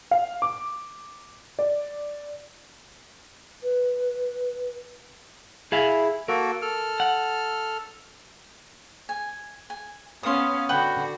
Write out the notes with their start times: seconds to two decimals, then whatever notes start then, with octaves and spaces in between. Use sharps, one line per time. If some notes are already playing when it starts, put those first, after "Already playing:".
0.11 F5
0.42 D6
1.59 D5
3.63 B4
5.72 E4 G#4 E5 F5
6.28 A#3 F#4 A4 A#4
6.62 A4 F6
7.00 F#5
9.09 G#5
9.70 G#5
10.23 B3 C#4 F5 C6 D#6
10.69 D3 F#4 B4 F#5 G5